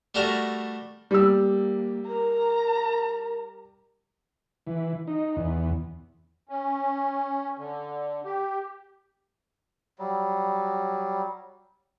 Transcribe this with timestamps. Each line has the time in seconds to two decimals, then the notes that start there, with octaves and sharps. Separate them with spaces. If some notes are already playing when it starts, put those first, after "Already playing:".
0.15 G3 A3 F#4 A#4 E5 A#5
1.11 G3 A#3 E6
2.07 A#4 A#5
4.67 E3
5.07 D#4
5.36 E2
6.49 C#4
7.58 D3
8.25 G4
9.99 F#3 G3